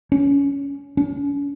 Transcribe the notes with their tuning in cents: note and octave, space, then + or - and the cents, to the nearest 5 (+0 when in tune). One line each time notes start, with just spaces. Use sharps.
C#4 +20
C#4 +40